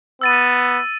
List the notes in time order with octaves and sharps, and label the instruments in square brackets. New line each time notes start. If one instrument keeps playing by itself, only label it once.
[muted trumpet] B3 [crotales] E6 A6 D#7